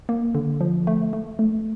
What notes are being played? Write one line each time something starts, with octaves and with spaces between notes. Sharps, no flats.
A#3
D3
F3
A3
A3
A3